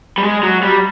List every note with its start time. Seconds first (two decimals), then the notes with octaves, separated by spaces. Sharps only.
0.18 G3
0.23 G#3
0.43 F#3
0.63 G3